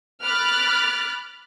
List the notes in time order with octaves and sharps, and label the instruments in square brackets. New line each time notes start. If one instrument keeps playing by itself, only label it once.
[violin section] B5 D6 F6 F#6 A6